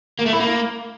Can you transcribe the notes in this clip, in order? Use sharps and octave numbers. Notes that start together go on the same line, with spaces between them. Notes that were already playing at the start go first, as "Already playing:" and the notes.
A#3
A3
E4
A#3